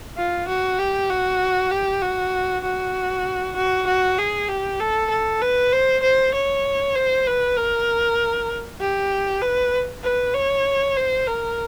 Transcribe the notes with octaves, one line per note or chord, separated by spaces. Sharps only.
F4
F#4
G4
F#4
G4
F#4
F#4
F#4
F#4
G#4
G4
A4
A4
B4
C5
C5
C#5
C5
B4
A#4
G4
B4
B4
C#5
C5
A#4